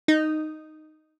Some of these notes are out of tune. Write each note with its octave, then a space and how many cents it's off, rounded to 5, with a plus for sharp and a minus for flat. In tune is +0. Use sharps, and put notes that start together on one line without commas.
D#4 -5